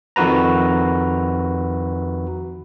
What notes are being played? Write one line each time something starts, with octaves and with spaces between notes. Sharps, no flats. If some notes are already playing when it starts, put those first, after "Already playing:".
F2 D#3 F#4 B4 A#5